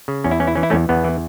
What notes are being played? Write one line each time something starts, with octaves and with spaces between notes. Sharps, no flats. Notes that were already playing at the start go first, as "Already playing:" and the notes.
C#3
E2 C#4
E4
E3 C#4
E4
E3 C#4
E4
E2 A3 C#4
E2 B3
E3